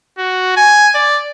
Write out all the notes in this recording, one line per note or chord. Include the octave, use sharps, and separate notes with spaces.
F#4
G#5
D5